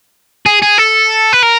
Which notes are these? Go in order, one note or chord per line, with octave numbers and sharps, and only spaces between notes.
G#4
G#4
A4
B4
A#4